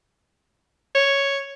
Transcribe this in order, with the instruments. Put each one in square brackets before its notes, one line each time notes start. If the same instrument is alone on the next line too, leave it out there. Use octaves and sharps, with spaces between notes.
[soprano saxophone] C#5